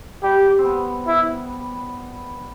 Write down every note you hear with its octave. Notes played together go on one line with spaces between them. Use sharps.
G3 G4
C4
B3
E4